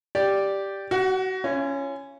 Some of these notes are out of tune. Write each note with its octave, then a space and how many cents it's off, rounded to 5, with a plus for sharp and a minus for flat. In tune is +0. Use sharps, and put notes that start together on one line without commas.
G4 +0 D5 +0
F#4 +30 F#5 -5
C#4 +0 F4 -45